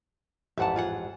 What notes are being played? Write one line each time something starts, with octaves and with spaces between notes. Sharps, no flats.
A1 F2 G#2 E5 F#5 A5
F4 G#4 F#5